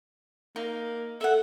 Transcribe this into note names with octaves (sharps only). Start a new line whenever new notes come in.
A#3 D#4
A4 E5 F#5